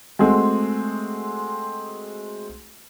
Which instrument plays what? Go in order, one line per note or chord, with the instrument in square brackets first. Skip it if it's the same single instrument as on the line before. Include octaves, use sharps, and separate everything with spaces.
[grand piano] G#3 A3 C4 F#4 G#4